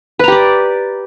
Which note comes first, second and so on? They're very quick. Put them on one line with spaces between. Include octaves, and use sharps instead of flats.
B4 A#5 G4 D5